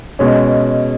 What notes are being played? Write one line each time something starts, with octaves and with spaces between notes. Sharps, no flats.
B2 G#3 C#4